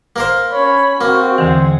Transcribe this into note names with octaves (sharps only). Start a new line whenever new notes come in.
A#3 A#4 C5
C#4 C#5 B5
A#3 C4 F#4
E2 D3 E3 G#3 F#5